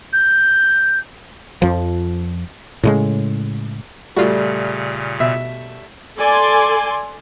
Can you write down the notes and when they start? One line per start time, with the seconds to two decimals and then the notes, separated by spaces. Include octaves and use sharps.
0.12 G6
1.62 F2 F3
2.83 A2 C#3 G#3
4.16 A#2 C#3 G3 A3 F4 F#4
5.20 B2 E5
6.17 A4 D5 G#5 C6